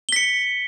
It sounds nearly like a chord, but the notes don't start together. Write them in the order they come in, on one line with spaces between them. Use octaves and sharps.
G7 B6 C#7